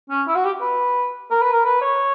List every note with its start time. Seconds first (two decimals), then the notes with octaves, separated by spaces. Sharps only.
0.10 C#4
0.28 E4
0.36 F#4
0.45 G4
0.62 B4
1.31 A#4
1.42 B4
1.53 A#4
1.65 B4
1.82 C#5